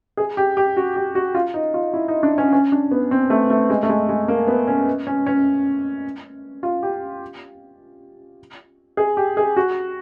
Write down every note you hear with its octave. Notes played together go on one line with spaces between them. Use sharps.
G#4
G4
G4
F#4
G4
F#4
F4
D#4
F4
E4
D#4
D4
C#4
C#4
D4
B3
C4
A3
A3
G#3
A3
G#3
G#3
A#3
B3
C#4
C#4
C#4
F4
G4
G#4
G4
G#4
F#4